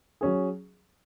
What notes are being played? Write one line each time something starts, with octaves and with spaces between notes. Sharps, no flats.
F#3 C#4 G#4